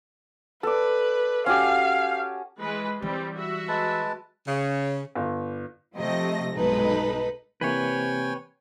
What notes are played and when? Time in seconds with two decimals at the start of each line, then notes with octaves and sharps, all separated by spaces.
0.63 A4 B4 D5
1.46 C#4 F#4 G4 F5
2.59 E3 G#3 B4
3.02 E3 G3 C4 G4
3.33 F#4 E5
3.68 G#3 B4 A5
4.47 C#3
5.15 G1
5.97 C3 F3 A3 D#5 A#6
6.55 B1 G2 G#3 D#4 A4 B4
7.61 C3 E3 A#3 B4 C#5 G5 G#5